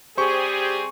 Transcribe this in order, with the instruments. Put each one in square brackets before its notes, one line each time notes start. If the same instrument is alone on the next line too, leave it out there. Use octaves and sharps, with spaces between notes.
[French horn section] G3 C4 G#4 [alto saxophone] G4 [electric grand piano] C5 C#6